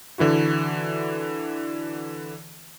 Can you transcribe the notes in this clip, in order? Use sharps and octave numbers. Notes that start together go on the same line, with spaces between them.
D3 E3 E4 F#4